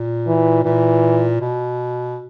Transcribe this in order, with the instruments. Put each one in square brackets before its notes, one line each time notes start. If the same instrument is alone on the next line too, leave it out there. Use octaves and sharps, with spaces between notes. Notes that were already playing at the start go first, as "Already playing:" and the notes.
Already playing: [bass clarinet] A#2
[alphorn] E3
[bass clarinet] A#2 [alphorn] E3
[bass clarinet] B2